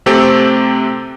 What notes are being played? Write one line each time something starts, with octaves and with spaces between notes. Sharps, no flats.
C3 A3 C4 G4 A4